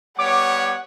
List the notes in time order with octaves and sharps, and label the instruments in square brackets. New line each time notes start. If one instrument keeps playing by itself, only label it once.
[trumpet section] G3 B3 C#5 [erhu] F#5 [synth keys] D6